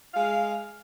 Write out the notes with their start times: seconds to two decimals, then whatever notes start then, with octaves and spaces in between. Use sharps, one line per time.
0.14 G#3 F5